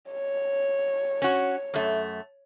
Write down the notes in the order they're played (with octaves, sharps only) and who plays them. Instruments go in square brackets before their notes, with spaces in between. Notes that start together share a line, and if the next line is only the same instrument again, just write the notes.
[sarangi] C#5
[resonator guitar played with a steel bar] C#4 F#4
F#2 A3